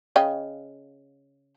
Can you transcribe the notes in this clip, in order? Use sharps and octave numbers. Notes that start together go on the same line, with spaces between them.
C#3 D#5 G5